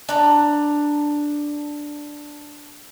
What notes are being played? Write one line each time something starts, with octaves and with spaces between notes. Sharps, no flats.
D4 A#5